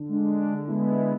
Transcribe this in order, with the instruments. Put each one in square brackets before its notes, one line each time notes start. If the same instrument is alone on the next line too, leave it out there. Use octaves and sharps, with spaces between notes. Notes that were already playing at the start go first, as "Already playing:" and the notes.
Already playing: [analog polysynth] D3
G#3 D4
D3
G#3 D4
D3
G#3 B3 E4
D3
G#3 B3 E4